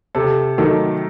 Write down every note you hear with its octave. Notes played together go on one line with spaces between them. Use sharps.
C3 A4
D#3 F#3 A3 A4